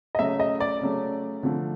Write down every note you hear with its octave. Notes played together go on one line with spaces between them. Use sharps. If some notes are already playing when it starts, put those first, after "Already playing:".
D#5
C#3 F#3 A3 E5
D#5
D5
C#3 F#3 A3
D3 F3 A3